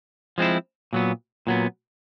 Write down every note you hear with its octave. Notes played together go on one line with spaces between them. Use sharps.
F3 G#3 C4 E4
A#2 F#3 B3
A#2 F#3 B3